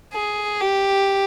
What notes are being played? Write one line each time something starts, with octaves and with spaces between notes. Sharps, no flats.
G#4
G4